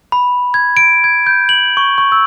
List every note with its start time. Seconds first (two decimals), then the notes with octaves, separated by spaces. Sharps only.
0.12 B5
0.54 G#6
0.77 D7
1.04 G#6
1.27 G6
1.49 F#7
1.77 C#6
1.98 C#6
2.12 E6